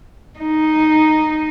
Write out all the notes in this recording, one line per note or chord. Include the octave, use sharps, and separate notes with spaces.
D#4